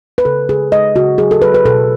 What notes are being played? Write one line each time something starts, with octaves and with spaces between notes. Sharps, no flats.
B4
C#3 A4
C#3 G#4
G#3 D#5
C#3 F#4
F#3 G#4
A4
F#3 B4
B4
B2 A4